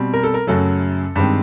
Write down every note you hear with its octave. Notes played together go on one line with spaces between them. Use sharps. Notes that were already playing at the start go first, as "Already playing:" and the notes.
Already playing: B2 G3 C4
A#4
A4
A#4
F#2 C#3 F#3 A3 A4
G2 D#3 G#3 C4